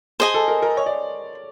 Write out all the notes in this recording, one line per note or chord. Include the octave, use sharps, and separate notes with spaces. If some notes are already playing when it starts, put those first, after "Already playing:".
G#4 C5 D#5 G#5
A4
A#4
A#4
C#5
D5